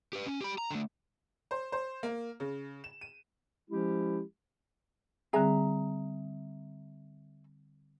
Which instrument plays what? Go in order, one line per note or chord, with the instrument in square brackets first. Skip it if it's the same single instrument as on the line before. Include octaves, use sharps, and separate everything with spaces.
[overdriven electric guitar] G4 B4
C#4
G4 B5
A#5
D3 A3
[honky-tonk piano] C5
C5
A#3
C#3
E7
D#7
[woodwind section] F3 G#3 C#4 E4 G4
[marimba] D3 G3 C4 [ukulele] G#4 E5 A#5